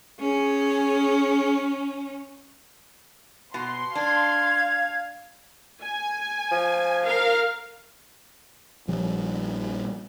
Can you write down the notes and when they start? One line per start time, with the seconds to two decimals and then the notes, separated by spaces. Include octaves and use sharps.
0.20 C#4 G#4
3.54 B2 C6
3.95 D4 F5 G#6
5.82 G#5
6.52 F3
7.04 A#4 F5
8.88 A#1 A#2 F3 G3